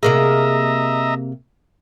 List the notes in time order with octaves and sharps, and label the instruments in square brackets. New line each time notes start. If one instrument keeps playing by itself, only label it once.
[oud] C3 A#3 G#4 [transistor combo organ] D#5 E5 A#5